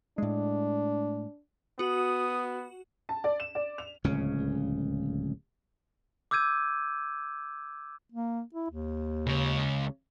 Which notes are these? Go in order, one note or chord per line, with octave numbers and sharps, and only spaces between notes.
A2 G#3 D4
B3 F#4 D#6
A5
D5
E7
D5
F7
D1 C#2 C#3 C#4
D6 E6 G6 G#6 D#7
A#3
E4
D#2
C#2 C#3